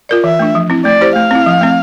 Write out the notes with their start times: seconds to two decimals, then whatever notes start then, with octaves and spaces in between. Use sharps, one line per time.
0.09 F4 A#4 D5
0.24 E3 E5
0.39 A3 D4
0.55 F3
0.70 C4 E4
0.85 A3 D5
1.01 E4 G4 C5
1.15 A3 F5
1.31 C4 E4
1.46 F3
1.61 A3 C4